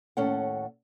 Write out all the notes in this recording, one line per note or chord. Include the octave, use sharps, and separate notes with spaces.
D#2 A2 C#4 A4 F#5